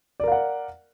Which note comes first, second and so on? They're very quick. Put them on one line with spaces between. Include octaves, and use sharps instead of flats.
D5 A#4 F5 F#5